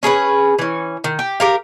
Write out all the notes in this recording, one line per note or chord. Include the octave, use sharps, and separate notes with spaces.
C#4 G#4 A#4 B4
E3 C#4
D#3
G4
G4 A#4 F5